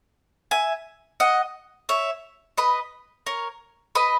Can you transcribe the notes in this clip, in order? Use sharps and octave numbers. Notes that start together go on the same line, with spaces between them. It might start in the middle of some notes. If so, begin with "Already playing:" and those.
E5 G#5
D#5 F#5
C#5 E5
B4 D#5
A#4 C#5
B4 D#5